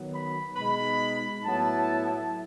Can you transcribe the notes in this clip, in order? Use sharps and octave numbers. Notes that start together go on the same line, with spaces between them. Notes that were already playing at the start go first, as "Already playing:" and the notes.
Already playing: D#3 F#3 B3
B5
B2 G#3 D#4 B5
A2 F#3 B3 E4 A5